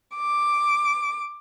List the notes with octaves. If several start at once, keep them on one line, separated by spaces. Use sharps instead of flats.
D6